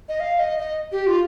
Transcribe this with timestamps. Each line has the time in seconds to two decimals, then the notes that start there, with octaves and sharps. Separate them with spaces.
0.09 D#5
0.20 F5
0.39 D#5
0.59 D#5
0.92 G4
1.07 F4